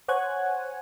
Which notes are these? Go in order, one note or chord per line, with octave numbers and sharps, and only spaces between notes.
C5 C#5 F#5 G#5 F#6 G#6